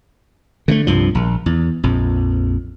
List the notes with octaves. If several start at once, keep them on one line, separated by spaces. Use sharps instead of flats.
D3 G#3 A3
C2 G2 F3
A#1
E2
A#1 F2